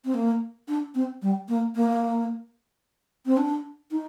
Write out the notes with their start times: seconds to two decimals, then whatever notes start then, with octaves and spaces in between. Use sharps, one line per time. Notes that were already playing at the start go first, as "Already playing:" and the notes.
0.05 C4
0.14 A#3
0.68 D4
0.95 C4
1.22 G3
1.49 A#3
1.75 A#3
3.26 C4
3.37 D4
3.91 D#4